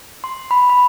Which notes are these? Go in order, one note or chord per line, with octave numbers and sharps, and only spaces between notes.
C6
B5
B5